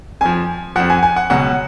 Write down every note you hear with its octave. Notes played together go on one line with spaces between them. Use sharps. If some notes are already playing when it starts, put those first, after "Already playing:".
F2 F3 G#5
F2 F3 F#5
G#5
G#5
F#5
C#2 B2 F#3 F#5